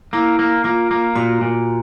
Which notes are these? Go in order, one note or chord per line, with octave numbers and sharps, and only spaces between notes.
A#3 E4
A#3
A#3 F4
A#3
A#2 F#4
A#2